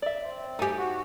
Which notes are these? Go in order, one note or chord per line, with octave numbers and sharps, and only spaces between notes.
D5 E5
C4
A3 D#4 G4 G#5
F#4